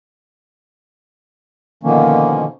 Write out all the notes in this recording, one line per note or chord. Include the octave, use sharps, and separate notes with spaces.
B2 D3 D#3 F3 A#3 C#4